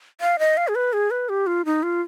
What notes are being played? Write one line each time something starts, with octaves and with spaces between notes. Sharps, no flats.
F5
D#5
F5
G#4
B4
G#4
B4
G4
F4
D#4
F4